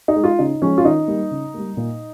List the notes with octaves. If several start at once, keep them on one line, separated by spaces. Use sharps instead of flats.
D#4
G#3
F4
C#3 D#4
F3 G#3 C#4
F4
D#3 D#4
G3 A#3
C#3
G3 A#3
A#2